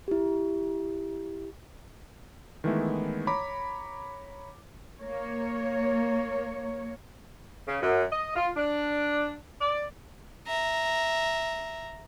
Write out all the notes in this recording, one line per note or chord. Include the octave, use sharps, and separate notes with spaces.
E4 G4
D#3 E3 G#3 A3 B3 E4
C#5 A#5 B5 D6
A#3 C#5
C#3
F#2
D#5
F4
D4
D5
E5 A#5